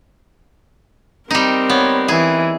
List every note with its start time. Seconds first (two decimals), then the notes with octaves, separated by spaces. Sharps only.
1.31 G3 C4 D#4 A#4
1.69 B3 C#5
2.08 E3 G#4